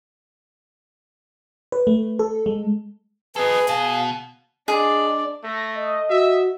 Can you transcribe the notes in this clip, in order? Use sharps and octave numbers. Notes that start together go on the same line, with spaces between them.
B4
A3
A4
G#3
G#4 A4 B4 D#5
B2 F5
G#3 D4 G#4 D5
A3 A#6
D#5
F#4 E5